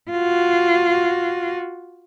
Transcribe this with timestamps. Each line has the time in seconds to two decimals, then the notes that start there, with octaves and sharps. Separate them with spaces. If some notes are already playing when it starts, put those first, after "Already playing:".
0.11 F4 F#4